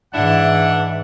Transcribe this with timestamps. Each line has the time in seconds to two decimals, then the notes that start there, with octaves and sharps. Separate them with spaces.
0.14 G#2 E3 D4 E4 F#5